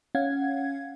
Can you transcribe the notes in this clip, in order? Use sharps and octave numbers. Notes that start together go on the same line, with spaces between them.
C#4 F5 F#5 G#6